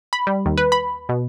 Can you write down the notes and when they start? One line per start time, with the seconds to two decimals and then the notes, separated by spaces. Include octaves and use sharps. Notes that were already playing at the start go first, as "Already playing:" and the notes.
0.13 B5
0.27 G3
0.46 D#2
0.58 B4
0.72 B5
1.09 B2